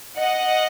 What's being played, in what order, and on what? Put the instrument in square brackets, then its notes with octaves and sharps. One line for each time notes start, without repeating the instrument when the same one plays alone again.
[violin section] D#5 F#5